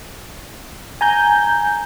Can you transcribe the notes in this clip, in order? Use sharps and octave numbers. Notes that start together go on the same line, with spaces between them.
G#5 A#5 G6